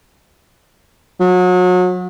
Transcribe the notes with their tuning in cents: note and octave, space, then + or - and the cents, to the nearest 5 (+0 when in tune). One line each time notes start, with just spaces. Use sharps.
F#3 -35